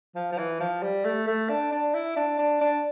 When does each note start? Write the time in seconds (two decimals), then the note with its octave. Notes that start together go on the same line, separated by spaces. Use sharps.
0.15 F3
0.32 F3
0.38 E3
0.60 F3
0.82 G3
1.05 A3
1.27 A3
1.49 D4
1.72 D4
1.94 E4
2.16 D4
2.39 D4
2.61 D4